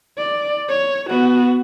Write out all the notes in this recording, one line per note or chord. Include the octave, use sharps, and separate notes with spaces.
D5
C#5
B3 F#4